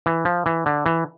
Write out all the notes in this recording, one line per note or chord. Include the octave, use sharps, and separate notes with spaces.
E3
F3
E3
D3
E3